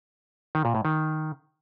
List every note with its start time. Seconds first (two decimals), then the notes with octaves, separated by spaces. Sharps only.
0.55 D#3
0.65 A#2
0.75 A2
0.85 D#3